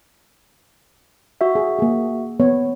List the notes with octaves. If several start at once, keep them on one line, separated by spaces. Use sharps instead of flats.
F#4 E5
G#4
A#3 G#4
B3 C#5